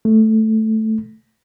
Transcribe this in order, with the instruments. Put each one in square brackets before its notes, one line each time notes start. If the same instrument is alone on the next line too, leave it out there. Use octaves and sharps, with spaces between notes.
[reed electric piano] A3